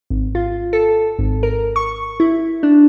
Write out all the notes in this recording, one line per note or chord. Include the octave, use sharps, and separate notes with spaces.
G#1
F4
A4
G#1
A#4
C#6
E4
D4